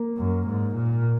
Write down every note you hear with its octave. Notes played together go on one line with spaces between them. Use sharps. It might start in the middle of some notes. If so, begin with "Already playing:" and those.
Already playing: A#3
F#2
G#2
A#2